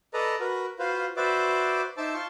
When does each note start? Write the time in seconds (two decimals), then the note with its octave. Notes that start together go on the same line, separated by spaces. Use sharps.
0.14 A4 B4 D5 D#5 A#5
0.40 F#4 A#4 B4
0.79 F4 F#4 B4 C5 F5
1.17 F#4 B4 C5 D5 E5 D6
1.97 D#4 C5 E5 A5 D6 E6
2.14 F4 A5 C6 C#6